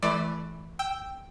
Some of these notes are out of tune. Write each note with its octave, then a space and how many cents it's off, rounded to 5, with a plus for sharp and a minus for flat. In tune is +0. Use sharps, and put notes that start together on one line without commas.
E3 +0 A3 -25 D5 +15
G5 +0 E6 +0